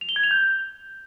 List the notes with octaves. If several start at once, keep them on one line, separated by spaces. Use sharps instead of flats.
F7
G7
G#6
F7
G6